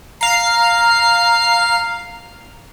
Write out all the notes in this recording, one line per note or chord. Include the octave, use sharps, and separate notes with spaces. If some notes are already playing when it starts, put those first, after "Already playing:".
F5 A#5 C7